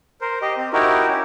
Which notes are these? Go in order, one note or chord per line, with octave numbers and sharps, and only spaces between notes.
A#4 C5
G4 D#5
C4
D#4 E4 F#4 G4 A#4
C#4